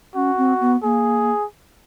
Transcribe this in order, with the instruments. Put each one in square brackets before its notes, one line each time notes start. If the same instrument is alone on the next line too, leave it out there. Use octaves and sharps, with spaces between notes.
[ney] C#4 [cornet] F#4
[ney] C4
B3
[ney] A#3 [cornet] G#4